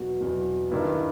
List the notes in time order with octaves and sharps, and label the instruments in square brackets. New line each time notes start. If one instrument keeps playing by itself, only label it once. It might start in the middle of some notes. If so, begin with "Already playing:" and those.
Already playing: [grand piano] E2 B2 F#3 F#4
E2 B2 F#3
G2 D#3 G3 B3 E4